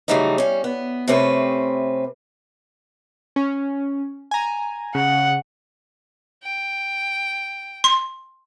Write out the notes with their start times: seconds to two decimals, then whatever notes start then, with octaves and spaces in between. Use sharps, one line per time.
0.08 C#3 E3 F#3 G3 A3 D#4
0.38 G3 C#4
0.64 B3
1.08 C3 A3 C4 C#4 B4
3.36 C#4
4.31 G#5 A#5
4.95 C#3 F#5
6.44 G5
7.84 C6